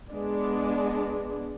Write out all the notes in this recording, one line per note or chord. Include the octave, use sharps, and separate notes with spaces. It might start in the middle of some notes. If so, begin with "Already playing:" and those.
G#3 B3 D4